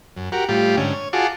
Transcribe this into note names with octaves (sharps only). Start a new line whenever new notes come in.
F#2
F#4 G4 A#4
A2 G3 F4 G4
G#2 D3 C#4
C#5
F4 F#4 G#4 A5 D6